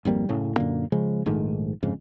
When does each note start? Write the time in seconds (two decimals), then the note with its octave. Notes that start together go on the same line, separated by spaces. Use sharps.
0.05 G#1 F2 G3 A#3
0.29 F#1 A2 C#3
0.56 F#2 A#2 D3 A#3
0.92 C#3 F3 G#3
1.26 A#1 G#2 D#3 A3
1.82 G1 F2 G#2 C#3